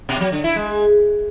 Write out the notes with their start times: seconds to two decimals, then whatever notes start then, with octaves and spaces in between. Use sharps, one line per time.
0.09 B2
0.21 F#3
0.32 D3
0.44 E4
0.56 G#3